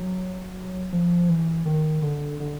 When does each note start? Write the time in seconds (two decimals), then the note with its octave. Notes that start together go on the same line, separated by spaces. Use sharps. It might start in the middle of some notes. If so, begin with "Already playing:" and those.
Already playing: F#3
0.93 F3
1.29 E3
1.66 D#3
2.02 D3
2.40 D3